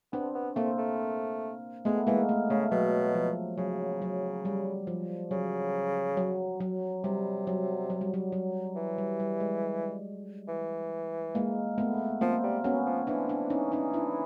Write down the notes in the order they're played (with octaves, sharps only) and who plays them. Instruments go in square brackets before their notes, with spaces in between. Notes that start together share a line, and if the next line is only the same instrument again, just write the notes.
[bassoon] B3 [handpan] C4 D4
[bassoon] B3
[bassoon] A3 [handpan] A#3 C4
[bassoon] A3
[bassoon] G#3 [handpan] A3 B3
[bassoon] E3 [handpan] G#3 A#3
[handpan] A3
[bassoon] C#3 [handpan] A3
[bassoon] B2 [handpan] F#3
[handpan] F3
[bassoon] C#3 [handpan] F#3
[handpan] F#3
G3
F3
[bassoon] C#3 [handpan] F#3
[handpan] F#3
F#3
[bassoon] C3 [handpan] G3
[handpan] F#3
F#3
G3
F#3
F#3
[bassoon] E3
[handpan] G3
G3
G#3
[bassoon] E3
[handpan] G#3 A#3
A3 B3
[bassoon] F3 [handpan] A#3 C4
[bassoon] G3
[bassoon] F#3 [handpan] B3 C#4
[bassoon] F3
[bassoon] E3 [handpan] C4 D4
[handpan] C4 D4
C#4 D#4
C#4 D#4
D4 E4